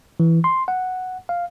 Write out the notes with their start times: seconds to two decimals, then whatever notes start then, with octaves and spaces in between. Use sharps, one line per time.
0.20 E3
0.44 C6
0.68 F#5
1.29 F5